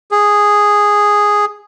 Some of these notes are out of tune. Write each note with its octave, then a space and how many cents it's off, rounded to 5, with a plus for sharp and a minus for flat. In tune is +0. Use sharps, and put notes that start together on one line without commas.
G#4 -5